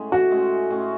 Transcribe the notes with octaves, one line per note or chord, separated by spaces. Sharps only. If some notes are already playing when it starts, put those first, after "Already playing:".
Already playing: A2 G#3 C#4
F#4
A2 G#3 C#4
A2 G#3 C#4